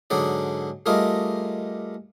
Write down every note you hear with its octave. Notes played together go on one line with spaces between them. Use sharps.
G#2 D3 F#3 G#4 D5
G3 A3 F4 G#4 A#4 D#5